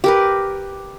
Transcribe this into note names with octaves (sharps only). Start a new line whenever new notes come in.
G4 A#4 B4